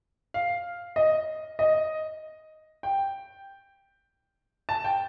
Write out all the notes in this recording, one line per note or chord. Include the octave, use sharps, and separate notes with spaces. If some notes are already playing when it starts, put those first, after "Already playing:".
F5
D#5
D#5
G5
A5
G5